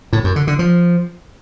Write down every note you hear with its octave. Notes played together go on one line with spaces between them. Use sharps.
A2
F#2
D3
D3
F3